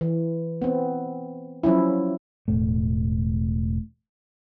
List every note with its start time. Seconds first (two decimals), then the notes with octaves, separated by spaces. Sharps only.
0.01 E3
0.62 B3 C4
1.63 F3 F#3 C#4 E4
2.48 E1 A2 A3